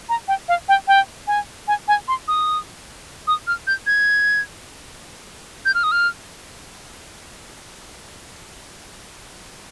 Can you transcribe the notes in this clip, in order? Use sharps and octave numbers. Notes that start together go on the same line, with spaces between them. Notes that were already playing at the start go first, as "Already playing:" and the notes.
A#5
G5
F5
G5
G5
G#5
G#5
G#5
C6
D#6
D#6
F6
G6
G#6
G6
F6
D#6
F6